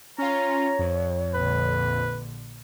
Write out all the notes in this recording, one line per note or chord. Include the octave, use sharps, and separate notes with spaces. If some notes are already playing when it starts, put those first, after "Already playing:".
C#4 F4 C#5 A#5
F2
A#1 D3 B4